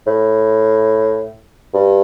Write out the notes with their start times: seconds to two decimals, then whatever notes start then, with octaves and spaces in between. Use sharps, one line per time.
0.07 A2
1.74 G2